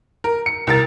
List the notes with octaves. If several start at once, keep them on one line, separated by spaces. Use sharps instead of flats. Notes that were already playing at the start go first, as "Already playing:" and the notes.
A#4
C#7
C2 A#4 A6